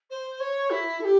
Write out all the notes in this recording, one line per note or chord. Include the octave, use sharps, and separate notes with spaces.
C5
C#5
E4
A4
G4